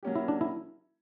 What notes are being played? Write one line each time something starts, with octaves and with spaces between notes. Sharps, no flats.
F#3 A#3 C#4 G4
E4
D4
E4